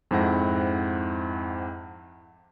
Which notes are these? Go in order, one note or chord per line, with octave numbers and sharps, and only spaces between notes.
F2 G#2 C4 E4 F#5 A#6